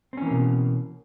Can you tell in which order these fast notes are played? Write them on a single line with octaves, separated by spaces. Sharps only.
C4 C#4 E3 A#3 B2